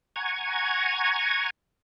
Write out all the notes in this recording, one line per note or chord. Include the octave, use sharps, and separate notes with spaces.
F#5 G#5 A#5 C#6 G#6